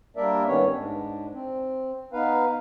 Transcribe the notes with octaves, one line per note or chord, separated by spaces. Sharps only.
G3 A#3 D4 A#4 D5 E5
G2 D#3 B3 C#4 C#5
G#2 D4
C4
B3 D#4 B4 F5